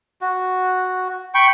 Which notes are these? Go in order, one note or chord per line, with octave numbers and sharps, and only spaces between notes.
F#4
G5 B5 C#6